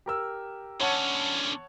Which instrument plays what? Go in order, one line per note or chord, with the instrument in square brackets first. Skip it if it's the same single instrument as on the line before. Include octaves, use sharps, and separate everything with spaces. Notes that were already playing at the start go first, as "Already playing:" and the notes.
[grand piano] G4 A#4 E6
[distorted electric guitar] D3 C#4 [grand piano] C#5 F#5 A5